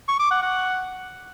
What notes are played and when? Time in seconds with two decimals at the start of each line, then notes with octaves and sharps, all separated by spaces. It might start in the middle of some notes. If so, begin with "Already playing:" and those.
0.08 C#6
0.20 D6
0.31 F#5
0.42 F#5